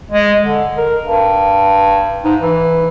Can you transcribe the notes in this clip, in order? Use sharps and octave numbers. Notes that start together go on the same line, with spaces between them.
G#3
D3
A#4
G2
G#2
E3